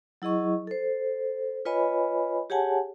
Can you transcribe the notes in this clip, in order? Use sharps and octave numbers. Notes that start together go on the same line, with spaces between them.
F#3 E4 G#4 D#5 C#6
A4 C5
F4 B4 C#5 D#5 G#5 B5
G4 G#4 C#5 F#5 G#5 A5